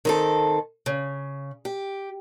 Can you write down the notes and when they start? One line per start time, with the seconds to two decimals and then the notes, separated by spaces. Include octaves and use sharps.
0.05 D#3 C4 A4
0.86 C#3
1.65 G4